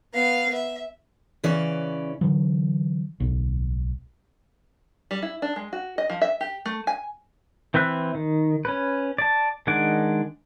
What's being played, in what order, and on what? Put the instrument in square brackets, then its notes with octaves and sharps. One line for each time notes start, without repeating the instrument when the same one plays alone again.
[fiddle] B3 F5
E5
[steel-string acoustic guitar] C#3 E3 C#4 B4 D5
[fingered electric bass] D3 E3 F#3
D1 B1
[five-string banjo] G3
E4
D4
G#3
F#4
D#5
F3
E5
G4
A3
G#5
[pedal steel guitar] E3 C4 B4 E5 F#6
D#3
C#4 B4
D5 A5
D#3 G#3 D4 F#5 D6